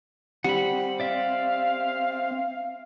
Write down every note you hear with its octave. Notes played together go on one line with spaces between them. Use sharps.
G3 C4 F#5 B5
D5 E5 F5